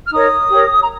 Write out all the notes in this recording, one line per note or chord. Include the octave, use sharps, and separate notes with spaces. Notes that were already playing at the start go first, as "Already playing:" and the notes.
F6
D#4 A#4 C#5 D#6
G4 A#4 C#5
A#5